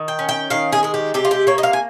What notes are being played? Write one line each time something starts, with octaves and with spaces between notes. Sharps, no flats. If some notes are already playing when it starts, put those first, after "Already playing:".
Already playing: D#3
G5
C#4
G5
D#3 F5
G#4
G#3 G#4
G4
C3 G4
F4
G4
A#3 C#5
D#5
F5
G#5